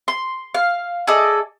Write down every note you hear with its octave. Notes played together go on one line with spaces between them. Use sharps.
C6
F5
G#4 A4 D5 D#5